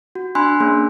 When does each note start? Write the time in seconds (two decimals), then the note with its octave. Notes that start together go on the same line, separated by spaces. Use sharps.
0.15 F#4
0.35 D4 G#5 B5 C6 F#6
0.60 A#3 C#4 D4 G#4